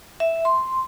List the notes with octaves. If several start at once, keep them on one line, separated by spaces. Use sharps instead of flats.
E5
C6